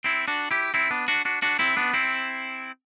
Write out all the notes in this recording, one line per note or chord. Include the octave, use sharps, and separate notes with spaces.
C4 E4
D4 F#4
E4 G4
C4 E4
B3 D4
D4 F#4
D4 F#4
D4 F#4
C4 E4
B3 D4
C4 E4